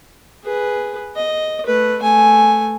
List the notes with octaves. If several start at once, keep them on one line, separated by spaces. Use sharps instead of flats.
G#4 B4
D#5
A3 B4
A3 G#5